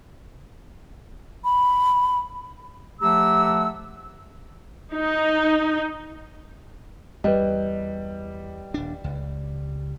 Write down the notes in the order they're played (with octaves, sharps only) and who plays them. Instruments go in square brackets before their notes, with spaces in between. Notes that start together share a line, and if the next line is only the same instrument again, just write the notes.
[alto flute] B5
[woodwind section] F3 A3 G4 F#5 A#5 E6
[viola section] D#4
[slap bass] E2 [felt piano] G3 [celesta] B4 D#5
[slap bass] D#1 D4
C#2